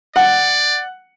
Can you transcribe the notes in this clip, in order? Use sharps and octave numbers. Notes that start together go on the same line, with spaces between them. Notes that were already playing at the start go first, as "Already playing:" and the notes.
D5 F#5